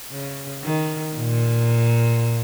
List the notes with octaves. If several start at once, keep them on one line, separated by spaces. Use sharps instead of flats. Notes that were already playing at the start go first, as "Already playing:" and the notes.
C#3
D#3
A#2